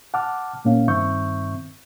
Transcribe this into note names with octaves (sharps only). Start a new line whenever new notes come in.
F#5 A5 D6 F6
A#2 A#3 C#4 F5
G2 D#3 C4 E5 C#6 G6